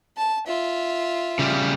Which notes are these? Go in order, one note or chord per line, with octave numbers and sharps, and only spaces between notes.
A5
F4 E5
C#3 G3